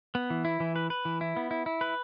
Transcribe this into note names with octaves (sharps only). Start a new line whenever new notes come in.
B3
E3
E4
E3
B4
B4
E3
E4
B3
E4
E4
B4